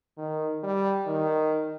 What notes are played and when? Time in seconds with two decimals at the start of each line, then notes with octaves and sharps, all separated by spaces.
0.18 D#3
0.64 G3
1.07 D#3